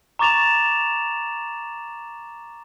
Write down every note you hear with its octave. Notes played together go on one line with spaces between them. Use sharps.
A#5 C#6 D6 A6 E7 F7